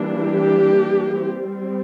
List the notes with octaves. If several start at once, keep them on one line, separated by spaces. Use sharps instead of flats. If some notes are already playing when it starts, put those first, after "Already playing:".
Already playing: E3 G3 A#3 D4
G4
G3 C4